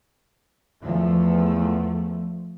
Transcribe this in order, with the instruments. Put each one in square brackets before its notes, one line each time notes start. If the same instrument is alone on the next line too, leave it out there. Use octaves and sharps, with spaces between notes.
[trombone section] E2 [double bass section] F3 A3